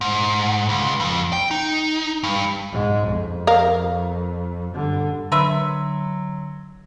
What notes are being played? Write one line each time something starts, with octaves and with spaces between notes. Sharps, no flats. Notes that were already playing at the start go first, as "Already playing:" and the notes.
G#2
C#2
F2
G5
D#4
G2
G#2 G#3
F2
A#4 F5
G2 D3
D3 F#3 A#4 B4 E5 C6 E6